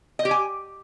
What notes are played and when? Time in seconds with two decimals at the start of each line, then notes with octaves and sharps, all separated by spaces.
0.19 D#5
0.25 G4
0.31 G#5